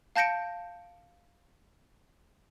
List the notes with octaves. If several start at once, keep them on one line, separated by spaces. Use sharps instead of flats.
F5 A5 G6 A#6 C#7 D7